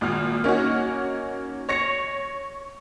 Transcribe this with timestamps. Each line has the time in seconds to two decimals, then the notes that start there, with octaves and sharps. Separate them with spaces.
0.01 G#1 A#2 F6
0.44 A#3 C#4 D#4 F#4
1.69 C#5 A#6 C#7